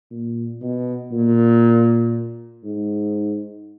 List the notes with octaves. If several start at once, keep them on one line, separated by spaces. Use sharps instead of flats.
A#2
B2
A#2
G#2